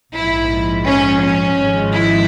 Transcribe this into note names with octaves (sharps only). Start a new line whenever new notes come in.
A#1 G#2 F3 E4
C#4
C#4
G#1 G#2 F3 G#3
E4